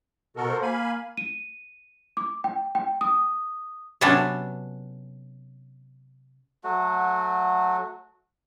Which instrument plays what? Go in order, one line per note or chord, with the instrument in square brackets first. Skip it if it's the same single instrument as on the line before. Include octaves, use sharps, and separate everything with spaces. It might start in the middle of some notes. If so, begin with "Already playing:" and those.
[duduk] B2 [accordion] F#4 A4 A#4
[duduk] C5
[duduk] A#3 [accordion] F5 G#5 B5
[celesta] D#7
D6
G5
G5
D#6
[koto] C3 F#3 B3 C#4 D4 A4
[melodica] F#3 A3 F#4